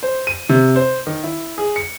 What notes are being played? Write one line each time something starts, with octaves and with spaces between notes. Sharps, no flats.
C5
D#7
C3
C5
D#3
E4
G#4
C#7